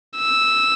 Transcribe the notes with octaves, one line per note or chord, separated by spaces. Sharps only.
E6